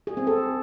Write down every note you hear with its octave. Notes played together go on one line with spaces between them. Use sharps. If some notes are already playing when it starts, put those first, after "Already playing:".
G#4
C4
A4